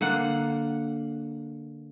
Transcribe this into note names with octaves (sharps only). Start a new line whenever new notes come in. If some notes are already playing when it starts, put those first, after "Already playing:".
D3 A#3 F#5